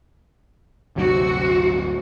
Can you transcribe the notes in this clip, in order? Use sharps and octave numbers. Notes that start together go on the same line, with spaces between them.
D1 G1 C3 F#3 F#4